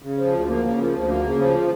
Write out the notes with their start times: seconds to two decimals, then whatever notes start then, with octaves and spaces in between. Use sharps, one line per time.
0.02 C#3
0.17 F3
0.33 D2
0.48 A#3
0.63 C#3
0.78 F3
0.93 D2
1.08 A#3
1.24 C#3
1.39 F3